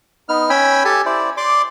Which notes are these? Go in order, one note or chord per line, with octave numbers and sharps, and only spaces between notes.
B3 D#4 F6
C#4 G5 G#5 B5 E6
G4 A4 G#5 A5
E4 C5 D5
D5 C6 D6